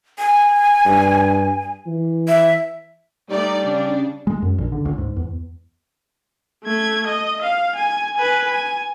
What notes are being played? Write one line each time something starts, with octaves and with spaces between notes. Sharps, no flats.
G#5
G2
E3
E5
G3 A3 D#4 D5
C#3 D4
G#3
F#2
A#1
D3
C#2
G#2
E2
A3 G#6
D#5
F5
G#5
B4 G#5
G#5